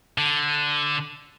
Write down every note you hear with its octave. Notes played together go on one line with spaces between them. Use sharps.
D3